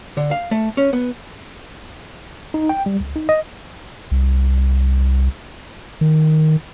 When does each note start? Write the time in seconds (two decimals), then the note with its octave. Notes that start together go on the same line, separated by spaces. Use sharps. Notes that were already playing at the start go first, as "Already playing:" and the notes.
0.17 D3
0.31 F5
0.51 A3
0.77 C#4
0.93 B3
2.54 D#4
2.69 G5
2.86 G3
3.00 C#2
3.16 D#4
3.29 D#5
4.11 C2
6.01 D#3